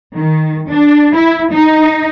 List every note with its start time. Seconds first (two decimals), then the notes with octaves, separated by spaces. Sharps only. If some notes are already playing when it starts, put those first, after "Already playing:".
0.16 D#3
0.71 D4
1.16 E4
1.53 D#4